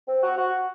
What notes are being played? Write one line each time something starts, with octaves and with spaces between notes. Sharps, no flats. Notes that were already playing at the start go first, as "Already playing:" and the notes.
C4
F#4
F#4